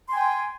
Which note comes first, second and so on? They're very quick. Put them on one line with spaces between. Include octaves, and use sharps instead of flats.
C6 G#5 G5